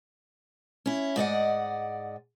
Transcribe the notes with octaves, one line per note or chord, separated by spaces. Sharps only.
C#4 E4
G#2 D5 D#5 F#5